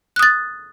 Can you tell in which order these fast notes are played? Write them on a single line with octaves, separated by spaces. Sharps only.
F#6 D#6 A6